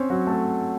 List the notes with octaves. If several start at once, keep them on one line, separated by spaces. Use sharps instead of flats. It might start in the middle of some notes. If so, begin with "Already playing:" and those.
Already playing: C4 C#4 C5 C#5
F#3 F#4
A3 A4